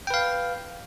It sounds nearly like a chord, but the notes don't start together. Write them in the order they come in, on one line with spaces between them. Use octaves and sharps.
G5 B4 F5